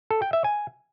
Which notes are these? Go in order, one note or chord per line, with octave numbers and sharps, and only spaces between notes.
A4
G5
E5
G#5